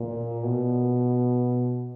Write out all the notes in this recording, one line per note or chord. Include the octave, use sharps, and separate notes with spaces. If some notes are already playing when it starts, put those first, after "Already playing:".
Already playing: A#2
B2